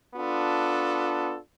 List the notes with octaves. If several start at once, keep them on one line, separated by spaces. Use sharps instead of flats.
B3 D4 F4 A4